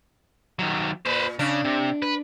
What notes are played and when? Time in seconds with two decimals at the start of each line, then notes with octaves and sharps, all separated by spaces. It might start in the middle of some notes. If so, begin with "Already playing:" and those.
0.59 D#3 F#3
1.06 A#2 B4 C5
1.39 C#3 D4
1.65 C3
2.02 B4